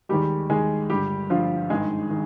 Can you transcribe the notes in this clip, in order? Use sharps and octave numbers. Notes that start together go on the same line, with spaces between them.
D#2 D#3 G3 G#3 G4
D#2 D#3 G#3 G#4
G1 G2 D3 G3 G4
G1 G2 D3 F3 F4
G#1 G2 D#3 G#3 G#4
D#3